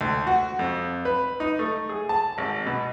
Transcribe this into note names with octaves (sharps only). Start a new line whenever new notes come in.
D2
F#4
F2
B4
D#4
A3
G#4
A5
G#1
B2